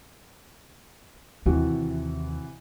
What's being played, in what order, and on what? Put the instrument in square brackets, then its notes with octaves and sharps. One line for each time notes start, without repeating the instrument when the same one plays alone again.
[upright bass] D#2 [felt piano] C3 E3 F#4